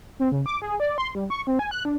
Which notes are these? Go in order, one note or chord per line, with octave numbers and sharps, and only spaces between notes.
C4
C#3
D6
G#4
D5
C6
G3
C#6
C4
G#5
F#6
D4